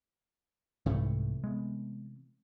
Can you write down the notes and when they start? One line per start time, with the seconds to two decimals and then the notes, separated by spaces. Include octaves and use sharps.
0.86 C2 G#2 C3 E3 A3
1.44 G#3 B3